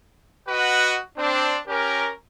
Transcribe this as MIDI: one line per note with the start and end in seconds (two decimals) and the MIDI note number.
0.47 0.99 66
0.47 0.99 71
0.47 0.99 75
0.47 0.99 78
1.17 1.56 60
1.17 1.56 62
1.67 2.09 61
1.67 2.09 67
1.67 2.09 70